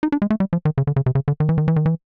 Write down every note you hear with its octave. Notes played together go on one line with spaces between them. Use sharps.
D#4
D4
G#3
A3
G3
F3
D#3
C#3
D3
C#3
C3
C#3
D3
D#3
E3
D#3
E3
D#3
E3